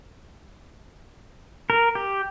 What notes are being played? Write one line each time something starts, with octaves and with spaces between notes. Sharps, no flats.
A#4
G4